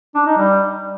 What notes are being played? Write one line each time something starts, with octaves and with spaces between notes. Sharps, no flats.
D4
D#4
G3